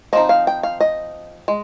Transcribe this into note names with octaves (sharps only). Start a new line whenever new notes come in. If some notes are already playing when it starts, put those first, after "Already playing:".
F3 C4 D#4 D#5
F5
G5
F5
D#5
G#3